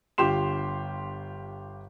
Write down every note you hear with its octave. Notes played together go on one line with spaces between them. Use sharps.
G1 F4 G4 C6 E7